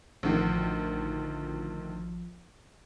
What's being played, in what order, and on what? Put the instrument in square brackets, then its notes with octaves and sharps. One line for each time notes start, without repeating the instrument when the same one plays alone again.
[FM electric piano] A1 F3 F4 [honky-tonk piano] D2 D3 D#3